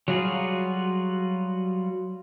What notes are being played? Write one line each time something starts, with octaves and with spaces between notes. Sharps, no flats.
F#3 G3 F4 F#4 G#4